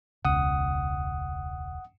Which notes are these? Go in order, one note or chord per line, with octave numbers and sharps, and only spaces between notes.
E1 C#2 F#5 D#6